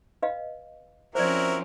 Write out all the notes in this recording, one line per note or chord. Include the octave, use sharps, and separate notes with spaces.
B4 D#5 F5
F3 C4 C#4 E4 F#4 A#4 C5 D5